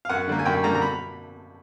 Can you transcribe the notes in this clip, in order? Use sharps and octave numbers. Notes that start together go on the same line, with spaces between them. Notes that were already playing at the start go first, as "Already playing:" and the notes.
F5
F#2 F#5
D3 G3 A#3
G#5
F#2 G5
D3 G3 A#3 A#5
A#5
B5